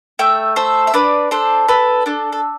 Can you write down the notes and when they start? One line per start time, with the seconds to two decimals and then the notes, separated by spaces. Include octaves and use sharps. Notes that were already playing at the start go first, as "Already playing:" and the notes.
0.19 A3 E5 G5
0.56 A4 C5 E5
0.87 E5
0.94 D4 B4 D5
1.31 D4 A4 C5
1.69 A4 B4
2.06 D4 A4
2.32 A4